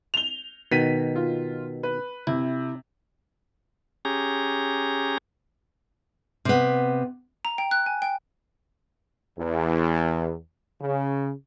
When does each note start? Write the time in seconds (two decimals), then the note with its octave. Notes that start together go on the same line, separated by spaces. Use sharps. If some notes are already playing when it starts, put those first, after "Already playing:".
0.14 F7 G7
0.72 B2 D#3 B6 D#7
1.15 F4
1.83 B4
2.27 C3 E4
4.05 C#4 G4 G#4 A#5
6.45 C3 B3
7.45 A#5
7.58 G5
7.71 F#6
7.86 G#5
8.02 G5
9.38 E2
10.81 C#3